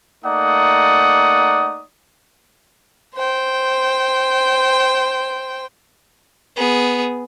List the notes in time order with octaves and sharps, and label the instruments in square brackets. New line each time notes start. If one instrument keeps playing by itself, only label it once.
[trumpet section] A3 A#3 D#4 D5 F#5 D#6
[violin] C5 G5
[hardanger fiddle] B3 G#4